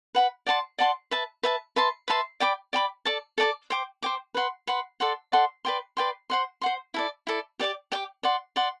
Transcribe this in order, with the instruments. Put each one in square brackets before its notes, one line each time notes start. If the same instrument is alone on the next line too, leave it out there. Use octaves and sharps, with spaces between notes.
[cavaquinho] B4 F#5 B5
D5 F#5 A5 C6
D5 F#5 A5 C6
B4 E5 A5
B4 E5 A5
B4 E5 A5 C6
B4 E5 A5 C6
D5 G5 B5 D6
D5 G5 B5 D6
A4 D5 A5 D6
A4 D5 A5 D6
C5 G5 D6
C5 G5 D6
B4 F#5 C6
B4 F#5 C6
A4 D5 F#5 C6
A4 D5 F#5 C6
B4 D5 G5 C6
B4 D5 G5 C6
C5 F#5 C6
C5 F#5 C6
E4 A4 D5
E4 A4 D5
G4 D5 G5 D6
G4 D5 G5 D6
D5 F#5 C6
D5 F#5 C6